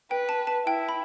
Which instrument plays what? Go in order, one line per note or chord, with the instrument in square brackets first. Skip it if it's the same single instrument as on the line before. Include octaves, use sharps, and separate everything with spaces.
[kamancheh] B4 [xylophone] G5
[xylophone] A5
A5
[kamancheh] E4 [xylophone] G5
[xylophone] B5